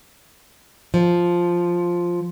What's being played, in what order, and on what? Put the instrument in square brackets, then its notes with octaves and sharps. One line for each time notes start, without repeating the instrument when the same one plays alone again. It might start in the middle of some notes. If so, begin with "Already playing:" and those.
[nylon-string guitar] F3